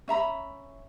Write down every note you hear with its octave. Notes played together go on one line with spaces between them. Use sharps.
C#4 E5 A#5 B5